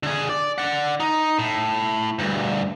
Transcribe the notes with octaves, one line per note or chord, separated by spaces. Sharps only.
D3 G#4
D5
D5 F#5
D#4
A2
D2 G2